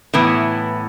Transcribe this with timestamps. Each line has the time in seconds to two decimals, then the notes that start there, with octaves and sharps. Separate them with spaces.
0.14 A2 E3 B3